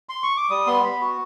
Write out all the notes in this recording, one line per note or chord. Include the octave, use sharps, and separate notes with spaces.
C6
C#6
D6
G3 D#6
B3 C6
B3 B5
F#4